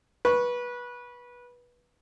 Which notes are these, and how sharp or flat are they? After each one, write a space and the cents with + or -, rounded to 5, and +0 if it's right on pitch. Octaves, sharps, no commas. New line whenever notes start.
B4 -20 C#6 +0